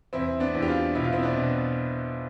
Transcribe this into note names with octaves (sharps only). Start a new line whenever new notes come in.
E2 C4 E4
B3 D4
E2
G4
D4 F4
B2 E4
F4
C4 E4
B3 D4
B2